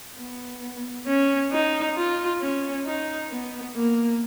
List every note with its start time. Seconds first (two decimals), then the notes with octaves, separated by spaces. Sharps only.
0.17 B3
1.06 C#4
1.52 D#4
1.96 F4
2.41 C#4
2.85 D#4
3.30 B3
3.76 A#3